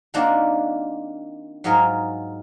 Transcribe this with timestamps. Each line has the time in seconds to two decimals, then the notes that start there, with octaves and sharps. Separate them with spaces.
0.14 D#3 A#3 C4 D4 F4 F#4
1.64 G#2 F#3 F4 G#4 A#4